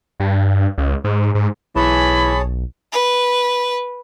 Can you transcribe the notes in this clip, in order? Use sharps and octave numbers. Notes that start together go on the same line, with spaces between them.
G2
C#2
G#2
G#2
B1 E3 G#4 C#5 A5 B5
B4